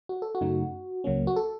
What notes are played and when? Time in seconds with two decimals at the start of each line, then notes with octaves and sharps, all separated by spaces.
0.09 F#4
0.22 A4
0.35 F#4
0.41 F#2 C#3 A3 D#4
1.04 C#2 C#3 F#3 A#3 C#4
1.27 F#4
1.36 A4